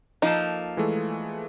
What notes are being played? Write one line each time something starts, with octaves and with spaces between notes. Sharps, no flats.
F3 A#3 D#4 A4
E3 G#3 A3